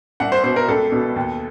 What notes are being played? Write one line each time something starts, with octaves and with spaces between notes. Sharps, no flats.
C2 F#5
C5
B2 C5
A#4
C#2 A4
B2
D#2